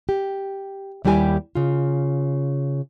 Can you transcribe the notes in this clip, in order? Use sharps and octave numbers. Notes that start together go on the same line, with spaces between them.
G4
D#2 G3 E4 G4 G#5
C#3 F4